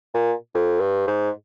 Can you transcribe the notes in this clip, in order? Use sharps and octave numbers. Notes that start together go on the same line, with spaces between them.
A#2
F2
G2
G#2